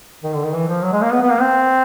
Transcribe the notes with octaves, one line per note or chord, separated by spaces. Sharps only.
D#3
D3
D#3
E3
F3
F#3
G#3
A#3
B3
B3
A#3
C4